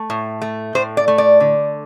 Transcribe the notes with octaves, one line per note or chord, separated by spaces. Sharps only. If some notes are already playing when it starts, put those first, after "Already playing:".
Already playing: A3
A2
A3
A2 C5
D5
A3
D5
D3